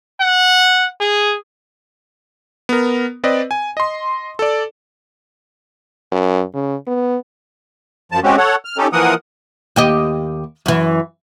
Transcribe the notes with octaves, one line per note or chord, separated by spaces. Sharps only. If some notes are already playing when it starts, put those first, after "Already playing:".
F#5
G#4
B3 A#4
C4 B4 D5 D#5
G#5
D#5 C6
A4 D5
F#2
C#3
B3
F#2 F3 A5
G#3 C4 C#4 F#4 G4
A4 C#5 F#5
F6
C#4 D#4 G4 A4
E3 F3 A#3 A#4 F#5 D#6
D#2 G4 D#5
F#2 E3